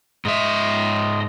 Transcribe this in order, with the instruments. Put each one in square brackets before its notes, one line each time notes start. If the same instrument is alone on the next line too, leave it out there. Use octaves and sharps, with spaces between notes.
[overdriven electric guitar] G#2 E5 [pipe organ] D#5 C6 D#6